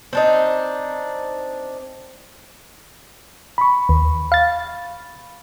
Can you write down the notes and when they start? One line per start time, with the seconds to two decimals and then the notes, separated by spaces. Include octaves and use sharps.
0.13 C4 D4 D#4
3.58 B5 C#6
3.89 D#2
4.32 F5 A6